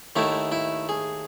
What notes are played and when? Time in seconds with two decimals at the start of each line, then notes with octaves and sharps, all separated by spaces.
0.16 D#2 D#3 A3 E4
0.52 E4
0.89 G#4